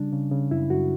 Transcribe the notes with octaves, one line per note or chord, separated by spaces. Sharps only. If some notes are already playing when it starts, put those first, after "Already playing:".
Already playing: C#3 G3 D4
C#3
C#3
F#2 E4
F#2 F#4